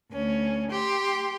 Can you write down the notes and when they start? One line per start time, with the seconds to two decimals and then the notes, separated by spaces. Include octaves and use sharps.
0.12 D2 C#4
0.70 G4 C6